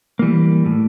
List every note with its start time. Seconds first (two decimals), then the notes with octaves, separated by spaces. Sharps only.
0.19 E3 G3 A#3
0.66 A2